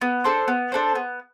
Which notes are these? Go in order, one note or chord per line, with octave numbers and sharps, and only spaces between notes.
B3
D4 A4 C5
B3
D4 A4 C5
B3